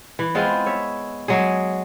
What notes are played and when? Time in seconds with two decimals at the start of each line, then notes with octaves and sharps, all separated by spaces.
0.19 E3
0.35 G#3 B3 C4 F4
0.66 C#5 E5
1.28 F#3 G#3 G#4